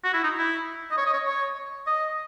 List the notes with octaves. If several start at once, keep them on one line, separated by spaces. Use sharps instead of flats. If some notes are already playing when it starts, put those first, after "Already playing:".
F#4
E4
D#4
E4
D#5
C#5
D#5
C#5
C#5
D#5